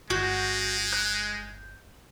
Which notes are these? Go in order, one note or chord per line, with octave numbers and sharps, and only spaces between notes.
G1 G#3 F#4 G6
F#6